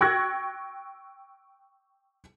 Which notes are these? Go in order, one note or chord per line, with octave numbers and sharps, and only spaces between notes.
G5 C#6 E6 F#6 G#6 A#6